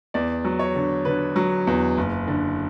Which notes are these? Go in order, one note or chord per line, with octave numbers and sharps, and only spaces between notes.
E2 D5
F#3
C#5
D3
D3 B4
F#3
E2
F#1
D3